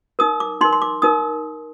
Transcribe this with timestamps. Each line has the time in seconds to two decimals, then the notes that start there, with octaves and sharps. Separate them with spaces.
0.19 D#4 A#4 D#6
0.40 D6
0.61 D#4 C6
0.65 A#4
0.73 C6
0.82 D6
1.02 D#4 A#4 D#6